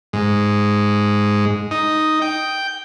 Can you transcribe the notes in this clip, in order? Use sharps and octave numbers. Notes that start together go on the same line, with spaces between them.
G#2
D#4
G5